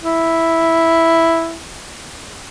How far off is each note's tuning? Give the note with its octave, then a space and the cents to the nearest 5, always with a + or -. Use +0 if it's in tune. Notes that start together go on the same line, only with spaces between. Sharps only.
E4 +0